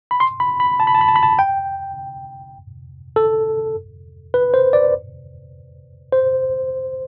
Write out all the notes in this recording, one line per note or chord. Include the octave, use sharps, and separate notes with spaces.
B5
C6
B5
B5
A5
B5
A5
B5
A5
B5
A5
G5
A4
B4
C5
D5
C5